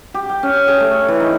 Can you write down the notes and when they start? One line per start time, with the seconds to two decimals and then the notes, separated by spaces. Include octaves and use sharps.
0.14 G4
0.29 G5
0.43 C#4
0.68 G#4
0.80 A3
1.08 E3
1.20 D#4